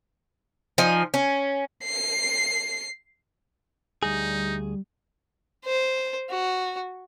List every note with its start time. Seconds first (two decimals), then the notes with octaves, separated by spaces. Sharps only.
0.78 F3 D#4 G#5
1.14 C#4
1.85 C7
4.03 D2 G3 D#4 G#4
5.65 C5
6.30 F#4